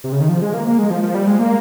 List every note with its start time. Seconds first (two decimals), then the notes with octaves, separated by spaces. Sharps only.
0.04 C3
0.12 C#3
0.21 D#3
0.29 F3
0.42 G#3
0.54 A#3
0.66 A#3
0.79 G#3
0.90 F3
1.03 F3
1.15 G3
1.27 G#3
1.39 A#3